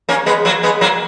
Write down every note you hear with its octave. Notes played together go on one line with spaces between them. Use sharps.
A#3 C#4
G#3 B3
F#3 A#3
G#3 B3
F#3 A#3